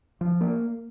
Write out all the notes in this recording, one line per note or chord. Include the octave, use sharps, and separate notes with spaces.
F3
A#3